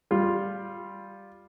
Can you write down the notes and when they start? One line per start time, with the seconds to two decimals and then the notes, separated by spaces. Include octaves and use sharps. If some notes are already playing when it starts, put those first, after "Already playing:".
0.11 G3 F4